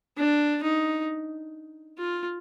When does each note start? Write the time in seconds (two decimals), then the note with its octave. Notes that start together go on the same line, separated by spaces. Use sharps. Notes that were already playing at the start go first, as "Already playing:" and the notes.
0.18 D4
0.63 D#4
1.98 F4